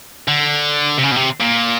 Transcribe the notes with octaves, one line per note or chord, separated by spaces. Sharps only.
D3
C3
C#3
B2
C3
A#2